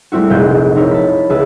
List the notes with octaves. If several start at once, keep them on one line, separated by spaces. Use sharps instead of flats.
G3 A3 C4 E4 F#4
F1 A#1 G#3 F#6 G6
C4 D#4 E4 A#4 C#5
A5 B5
C#2 G#4 B4 E5 A5